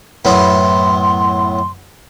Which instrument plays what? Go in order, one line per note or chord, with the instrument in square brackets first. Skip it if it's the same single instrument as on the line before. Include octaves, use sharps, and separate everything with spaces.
[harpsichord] F#2 A2 B3 [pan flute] C6